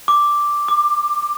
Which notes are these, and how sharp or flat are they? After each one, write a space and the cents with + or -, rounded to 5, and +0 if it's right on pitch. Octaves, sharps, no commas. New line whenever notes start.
D6 +0
D6 +20